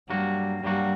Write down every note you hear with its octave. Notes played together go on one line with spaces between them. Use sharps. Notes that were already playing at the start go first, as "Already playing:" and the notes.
G2 F#3 G3 A#3 F#4
G2 F#3 G3 A#3 F#4